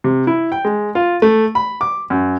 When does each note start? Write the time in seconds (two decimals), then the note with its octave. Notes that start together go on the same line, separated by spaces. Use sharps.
0.04 C3
0.27 E4
0.52 G5
0.65 G#3
0.95 F4
1.22 A3
1.55 B5
1.81 D6
2.10 F#2